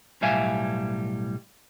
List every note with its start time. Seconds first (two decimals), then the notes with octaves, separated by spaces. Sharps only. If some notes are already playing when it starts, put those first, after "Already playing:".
0.22 B1 A2 G3 E5 F5 G#5